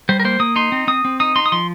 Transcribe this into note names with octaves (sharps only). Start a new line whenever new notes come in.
G3 C5
A#4
A#3 C5
A#3 D#6
D#4 C6
C4
C4 D#6
C4
D#4 D#6
D#4 C6
D#6
F3 C6